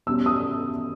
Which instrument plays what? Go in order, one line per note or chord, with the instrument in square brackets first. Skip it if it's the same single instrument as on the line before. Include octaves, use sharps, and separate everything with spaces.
[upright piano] B2 G3 C#4 E6
D#6